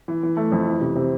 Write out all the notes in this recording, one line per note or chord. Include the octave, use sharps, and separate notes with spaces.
E3
E3
A3
F2
E3
C3
C3